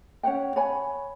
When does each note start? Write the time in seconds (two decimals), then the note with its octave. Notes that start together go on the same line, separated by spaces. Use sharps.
0.23 C#4 C#5 F#5 G5
0.56 C#5 F#5 G#5 B5